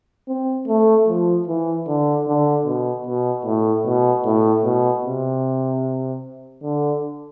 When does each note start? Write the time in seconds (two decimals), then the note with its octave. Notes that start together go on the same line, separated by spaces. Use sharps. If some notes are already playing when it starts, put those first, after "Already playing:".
0.28 C4
0.68 A3
1.08 F3
1.48 E3
1.87 D3
2.27 D3
2.66 B2
3.07 B2
3.45 A2
3.86 B2
4.25 A2
4.64 B2
5.04 C3
6.64 D3